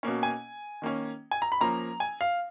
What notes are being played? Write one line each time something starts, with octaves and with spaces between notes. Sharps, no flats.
B2 A#3 C#4
G#5
D#3 A#3 C#4
G#5
A#5
B5
F3 A#3 C#4 A#5
G#5
F5